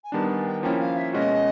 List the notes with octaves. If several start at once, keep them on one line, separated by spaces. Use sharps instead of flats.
G#5
D#3 G3 B3 D4 A5
G#5
G5
F3 A#3 C#4 E4 G5
F5
E5
B2 G#3 C#4 F#4 D#5